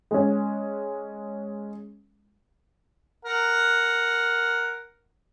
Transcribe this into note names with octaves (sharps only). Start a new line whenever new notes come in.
G#3 C#4
A#4 F#5